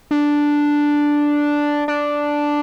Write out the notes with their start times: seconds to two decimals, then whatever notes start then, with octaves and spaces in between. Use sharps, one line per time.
0.11 D4
1.88 D4